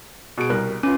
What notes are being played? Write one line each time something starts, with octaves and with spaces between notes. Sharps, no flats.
B2 G#4 D7
C2 A#4 F#6
C#4 F4 B4